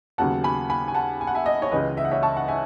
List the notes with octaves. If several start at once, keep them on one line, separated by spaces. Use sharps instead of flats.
D#2 C#3 F#3 B3 F#5 A5
G#5 B5
G#5 B5
G#5
F#5 A5
G#5
F#5
E5 G#5
D#5 F#5
C#5
C#2 C#3 E3 B4 D#5
E5
F#5
C#5 E5
A5 C#6
F#5
E5 G#5